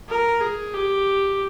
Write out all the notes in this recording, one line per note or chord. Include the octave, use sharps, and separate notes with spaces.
A#4
G#4
G4